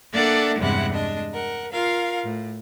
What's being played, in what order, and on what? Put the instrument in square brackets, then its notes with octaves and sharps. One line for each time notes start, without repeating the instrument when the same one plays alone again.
[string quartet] A#3 D4 A4 D5 E5 F#5
E2 G2 C3 G#3 E4 F#5
G#3 D4 D#5
A#4 F#5
F4 A#4 F5
A2